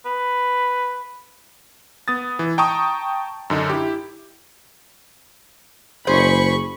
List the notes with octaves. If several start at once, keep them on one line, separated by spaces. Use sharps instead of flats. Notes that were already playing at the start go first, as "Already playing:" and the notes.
B4
B3 D#6 A6
E3
G5 A5 A#5 C#6 D#6
F#2 D3 D#4
E4 G4
F#1 G#4 C5 B5 C#6